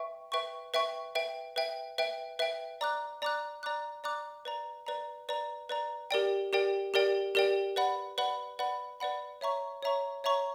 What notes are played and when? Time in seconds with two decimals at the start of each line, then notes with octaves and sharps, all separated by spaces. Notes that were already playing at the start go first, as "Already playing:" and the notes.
Already playing: B4 E5 G5 C#6
0.32 B4 E5 G5 C#6
0.74 B4 E5 G5 C#6
1.15 B4 E5 G5
1.56 B4 E5 G5
1.98 B4 E5 G5
2.39 B4 E5 G5
2.81 D5 A#5 D6 F#6
3.22 D5 A#5 D6 F#6
3.63 D5 A#5 D6 F#6
4.04 D5 A#5 D6 F#6
4.45 B4 D5 A#5
4.87 B4 D5 A#5
5.29 B4 D5 A#5
5.69 B4 D5 A#5
6.11 G4 A#4 D5 G5
6.53 G4 A#4 D5 G5
6.94 G4 A#4 D5 G5
7.35 G4 A#4 D5 G5
7.76 B4 D5 F#5 B5
8.18 B4 D5 F#5 B5
8.59 B4 D5 F#5 B5
9.00 B4 D5 F#5 B5
9.41 C#5 E5 A#5 C#6
9.83 C#5 E5 A#5 C#6
10.24 C#5 E5 A#5 C#6